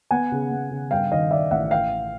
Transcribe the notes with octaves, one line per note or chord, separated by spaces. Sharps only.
B3 F#5 G#5
C#3
B3
C#3
G2 F5 G5
D#3 D#5 F5
D#3 D5 E5
A1 E5 F#5
F5 G5